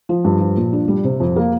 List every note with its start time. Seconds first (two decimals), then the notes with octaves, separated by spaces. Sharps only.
0.09 F3
0.24 G2
0.41 F3
0.57 A#2
0.73 D4
0.88 G3
1.04 C3
1.20 F2
1.36 A#3